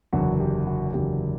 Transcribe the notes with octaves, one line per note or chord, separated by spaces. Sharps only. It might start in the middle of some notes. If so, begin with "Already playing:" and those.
F#1 E2 D3 F#3 F#4
G4
F#4
F#1 E2 D3 F#3 G4